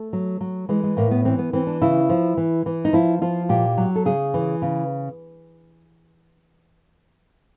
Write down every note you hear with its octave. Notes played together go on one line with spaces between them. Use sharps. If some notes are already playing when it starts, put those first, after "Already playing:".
Already playing: A3
F#3
F#3
E3 G#3
G#3
A2 A#3
B3
E3 C4
B3
E3 C4
D4
C#3 E4
F3
E3
E3
D#4
F3 E4
F3 F4
A#2 G4
F#3
A4
C#3 G#4
E3
C#3